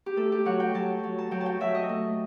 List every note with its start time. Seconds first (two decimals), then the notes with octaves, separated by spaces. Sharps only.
0.06 G4
0.16 A3 A4
0.32 G4
0.45 F#3 F#5
0.60 G5
0.74 F#3 A5
1.03 F#3
1.18 A5
1.31 F#3 G5
1.41 A5
1.46 G5
1.60 F#3 E5
1.75 D#5
1.89 A3